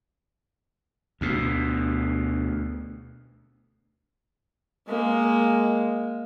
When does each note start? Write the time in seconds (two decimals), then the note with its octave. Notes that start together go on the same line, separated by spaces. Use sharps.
1.21 D2 B2
4.88 G#3 A#3